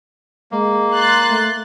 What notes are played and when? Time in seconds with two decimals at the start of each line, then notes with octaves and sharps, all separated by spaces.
0.51 G#3 A#3
0.93 C6 F#6 A6
1.29 A3